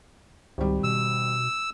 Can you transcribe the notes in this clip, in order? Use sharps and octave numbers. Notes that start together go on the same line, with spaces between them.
G#1 C#2 G3
B2 E6